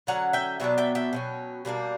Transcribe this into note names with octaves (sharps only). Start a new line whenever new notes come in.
D3 F#3 C#4 F#5 A#5
E5 G5
B2 F#3 B3 D4 E5
E5 G5
E5 G5
B2 F#3 C#4
B2 G3 A#3 D4